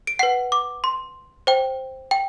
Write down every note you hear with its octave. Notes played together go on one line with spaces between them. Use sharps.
D7
B4 F#5 C7
D6
C6
C5 G5
G5